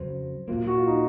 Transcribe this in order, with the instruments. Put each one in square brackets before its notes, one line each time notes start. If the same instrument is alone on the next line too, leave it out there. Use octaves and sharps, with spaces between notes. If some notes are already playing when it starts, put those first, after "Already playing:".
Already playing: [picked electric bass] F2 C#3 F#3 [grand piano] C5
[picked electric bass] A#2 F#3 A#3 [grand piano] F4
[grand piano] F#4
F4
D#4